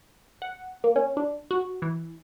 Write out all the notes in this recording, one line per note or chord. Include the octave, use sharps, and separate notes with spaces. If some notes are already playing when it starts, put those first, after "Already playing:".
F#5
A#3
C#4
D4
F#4
E3